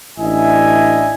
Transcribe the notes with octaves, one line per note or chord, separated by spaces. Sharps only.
A1 D4 E4 D#5 E5 G#5